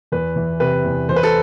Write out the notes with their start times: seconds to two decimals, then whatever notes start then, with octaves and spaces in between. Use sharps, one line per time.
0.12 E2 B4
0.36 E3
0.60 C3 B4
0.84 E2
1.09 E3 C5
1.16 B4
1.23 A4